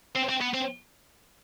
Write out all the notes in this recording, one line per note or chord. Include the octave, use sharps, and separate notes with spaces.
C4
C4
B3
C4